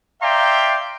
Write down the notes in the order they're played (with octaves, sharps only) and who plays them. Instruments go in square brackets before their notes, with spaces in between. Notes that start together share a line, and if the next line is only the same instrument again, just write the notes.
[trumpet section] D5 E5 F5 G5 A#5 C6